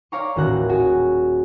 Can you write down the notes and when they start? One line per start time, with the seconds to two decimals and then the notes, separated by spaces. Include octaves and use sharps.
0.12 C#5 D5 F5 A#5 C6 C#6
0.36 D#1 A1 F#4 A#5 F#6
0.69 F#4 G#4